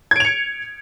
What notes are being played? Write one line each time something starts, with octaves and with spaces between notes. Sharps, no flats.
G#6 C#7 D7 F7